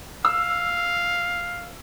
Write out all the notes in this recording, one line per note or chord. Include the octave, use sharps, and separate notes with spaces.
F5 E6